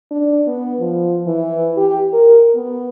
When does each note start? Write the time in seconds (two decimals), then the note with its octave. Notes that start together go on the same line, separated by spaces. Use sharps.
0.11 D4
0.47 B3
0.80 F3
1.27 E3
1.77 G4
2.13 A#4
2.55 B3